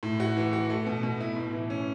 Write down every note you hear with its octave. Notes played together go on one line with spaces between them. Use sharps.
A2
F#4
E3
F#4
A3
B2
B2
E4
A2
E3
C#4